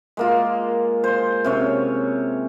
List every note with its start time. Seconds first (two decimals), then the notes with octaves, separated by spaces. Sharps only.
0.17 G#3 A#3 F4
1.04 C5 C6
1.44 C3 C#4 C#5